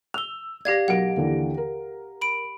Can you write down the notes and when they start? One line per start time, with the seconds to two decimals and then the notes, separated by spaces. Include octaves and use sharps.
0.14 E6 F7 G7
0.65 G4 D5 F5 G#6 A#6
0.88 B1 A#4 F#5 D7
1.16 D#2 D3 E3
1.57 A#4
2.21 B5 D7